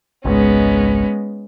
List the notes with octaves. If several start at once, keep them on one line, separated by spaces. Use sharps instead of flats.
G#1 C#2 G#2 G#3 B3 C#4